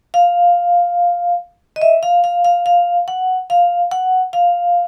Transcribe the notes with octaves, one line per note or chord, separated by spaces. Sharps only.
F5
D#5
E5
F5
F5
F5
F5
F#5
F5
F#5
F5